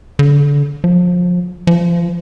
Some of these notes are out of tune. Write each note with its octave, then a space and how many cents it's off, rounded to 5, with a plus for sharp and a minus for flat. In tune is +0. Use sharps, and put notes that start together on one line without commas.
D3 -30
F3 +30
F3 -25